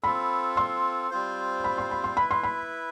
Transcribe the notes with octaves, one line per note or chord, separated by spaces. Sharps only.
C4 F4 A4 B5
C6
G3 C4 F4 C5
B5
C6
B5
C6
E4 B4 E5 B5
C6
B5